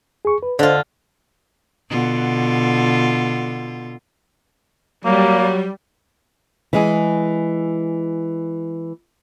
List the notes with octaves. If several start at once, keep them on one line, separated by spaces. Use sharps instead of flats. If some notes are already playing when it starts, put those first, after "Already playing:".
G#4 C#6
B4
D3 F4 C5 D#5
B2 D3 F4
F#3 G3 A#3
E3 G#3 G#4